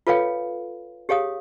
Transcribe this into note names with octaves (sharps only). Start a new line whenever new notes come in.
F4 A4 B4 C#5 F5 G5
G4 G#4 C#5 F5 D#6